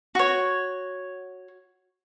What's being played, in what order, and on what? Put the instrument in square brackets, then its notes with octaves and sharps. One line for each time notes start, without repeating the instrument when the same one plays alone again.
[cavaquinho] F#4 C#5